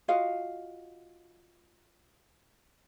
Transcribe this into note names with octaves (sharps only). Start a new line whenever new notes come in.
F4 F#4 D#5 F5